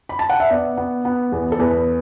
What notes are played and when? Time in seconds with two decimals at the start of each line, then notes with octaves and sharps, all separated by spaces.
0.09 B5
0.19 A5
0.29 F#5
0.40 E5
0.50 B3 D5
0.77 B3
1.05 B3
1.32 E2
1.52 A4
1.59 E2 B4